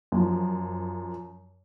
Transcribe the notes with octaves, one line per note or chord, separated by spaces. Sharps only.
F#2 F3